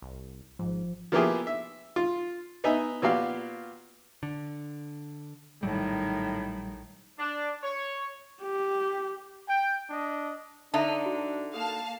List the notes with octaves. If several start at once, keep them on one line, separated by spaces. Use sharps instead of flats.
C2
G#1 G#2 F3
F3 A#3 B3 E4 G4 G#4
E5
F4
B3 D#4 D#5 E5 G#5
A#2 B3 F#4 G4 F5
D3
A#1 A2 D#3 F#3 G3
D4
C#5
G4
G5
D4 D#5
D3 D4 D#4 A4 E5 A5
F#4
A#3 A4 F5 A5